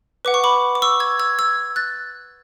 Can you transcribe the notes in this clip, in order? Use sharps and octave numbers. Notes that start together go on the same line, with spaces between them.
B4 F#5 D6
C#6
B5 D6
D6
C#6 E6
E6 G#6
E6 G#6
E6 G#6
F#6 A6